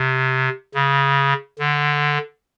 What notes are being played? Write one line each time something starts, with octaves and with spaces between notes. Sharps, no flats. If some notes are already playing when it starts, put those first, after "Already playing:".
Already playing: C3
C#3
D3